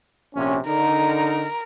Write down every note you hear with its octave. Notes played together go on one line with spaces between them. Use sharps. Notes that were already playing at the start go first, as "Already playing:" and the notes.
A#1 C3 C#4
D3 D#4 A#4